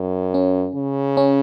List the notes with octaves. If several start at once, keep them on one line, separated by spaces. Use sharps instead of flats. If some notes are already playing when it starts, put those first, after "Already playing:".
Already playing: F#2
C#4
C#3
C#4